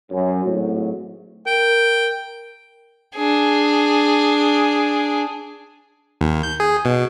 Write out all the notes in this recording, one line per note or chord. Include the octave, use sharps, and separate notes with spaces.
F#2
G#1 A2 F#3
A#4 G5
D4 G#4
D#2
G6
G#4
B2